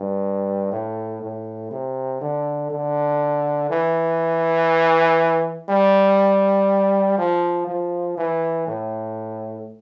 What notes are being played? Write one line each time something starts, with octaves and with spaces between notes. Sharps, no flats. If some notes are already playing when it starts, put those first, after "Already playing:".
Already playing: G2
A2
A2
C3
D3
D3
E3
G3
F3
F3
E3
A2